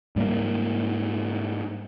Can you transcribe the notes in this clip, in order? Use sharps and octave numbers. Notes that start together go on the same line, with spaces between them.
G#2 G3 G#3 A#3